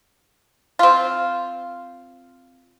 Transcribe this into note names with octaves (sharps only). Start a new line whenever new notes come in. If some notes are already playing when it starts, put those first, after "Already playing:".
C4 F4